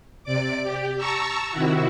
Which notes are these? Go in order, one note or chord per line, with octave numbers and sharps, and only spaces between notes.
C3 D5 D6
G4
A5 A#5 C#6 E6
C3 D#3 E4 F#4